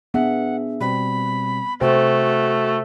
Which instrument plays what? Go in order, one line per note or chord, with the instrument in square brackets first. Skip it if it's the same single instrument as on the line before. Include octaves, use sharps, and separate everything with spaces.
[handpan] B3 [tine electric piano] D4 G#4 E5 [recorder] F#5
[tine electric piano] B2 G3 C4 [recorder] B5
[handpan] C3 C5 [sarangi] A3 [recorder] F#4 [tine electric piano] G5